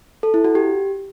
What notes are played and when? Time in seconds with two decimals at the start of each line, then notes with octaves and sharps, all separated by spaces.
0.23 A4
0.34 E4
0.44 F#4
0.55 G4